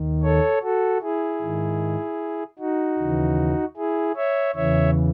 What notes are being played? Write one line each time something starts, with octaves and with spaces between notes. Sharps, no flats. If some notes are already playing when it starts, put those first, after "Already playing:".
Already playing: D#2 D#3
A4 C#5
F#4 A4
E4 G#4
G#2 D#3
D#4 F#4
D#2 C#3 E3
E4 G#4
C#5 E5
E2 C#3 E3 C#5 E5